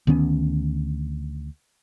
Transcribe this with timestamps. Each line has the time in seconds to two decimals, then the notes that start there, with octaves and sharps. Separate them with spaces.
0.07 D2 D#3 B3 C#4